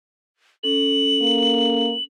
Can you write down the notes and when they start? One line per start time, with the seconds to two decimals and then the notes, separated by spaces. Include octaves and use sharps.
0.63 C#4 A4 F#7
1.21 A#3